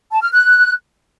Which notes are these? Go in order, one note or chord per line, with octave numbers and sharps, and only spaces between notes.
A5
F6
F#6